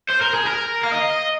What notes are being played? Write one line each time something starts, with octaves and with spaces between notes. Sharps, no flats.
C5
A#4
G#4
A#4
F5
D#5